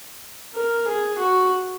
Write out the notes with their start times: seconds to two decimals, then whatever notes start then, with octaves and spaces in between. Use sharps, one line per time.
0.55 A#4
0.87 G#4
1.18 F#4